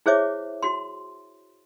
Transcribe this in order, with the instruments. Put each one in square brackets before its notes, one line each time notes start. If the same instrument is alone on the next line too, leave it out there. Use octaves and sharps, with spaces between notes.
[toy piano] E4 G#4 C5 C#5 E5 D6
F#4 C6